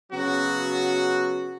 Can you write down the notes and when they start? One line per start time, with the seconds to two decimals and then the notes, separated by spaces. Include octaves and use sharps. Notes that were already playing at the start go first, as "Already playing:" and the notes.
0.12 C#3 F#3 B3 C#4 F#4